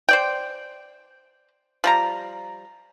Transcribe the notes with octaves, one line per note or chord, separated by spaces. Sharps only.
C5 D5 G5
F3 G3 A#5